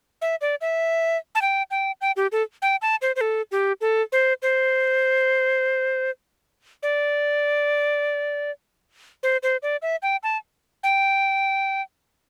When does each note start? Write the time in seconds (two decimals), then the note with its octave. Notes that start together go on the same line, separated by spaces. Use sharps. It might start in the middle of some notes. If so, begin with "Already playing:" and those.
0.22 E5
0.41 D5
0.61 E5
1.35 A5
1.42 G5
1.71 G5
2.01 G5
2.17 G4
2.32 A4
2.62 G5
2.82 A5
3.02 C5
3.16 C5
3.21 A4
3.52 G4
3.81 A4
4.12 C5
4.42 C5
6.83 D5
9.23 C5
9.43 C5
9.62 D5
9.82 E5
10.02 G5
10.23 A5
10.83 G5